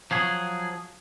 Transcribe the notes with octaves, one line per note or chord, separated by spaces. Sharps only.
F3 F#3 G#4